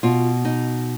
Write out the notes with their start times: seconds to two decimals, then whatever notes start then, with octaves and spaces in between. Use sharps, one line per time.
0.03 B2 F4
0.45 D#4